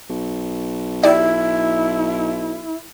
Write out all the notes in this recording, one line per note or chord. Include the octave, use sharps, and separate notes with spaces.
B1
E4 G4 D5